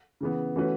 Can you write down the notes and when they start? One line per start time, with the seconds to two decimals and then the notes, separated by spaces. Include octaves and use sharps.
0.21 C#3 E3 B3
0.56 E3 A3 C#4 F#4 B4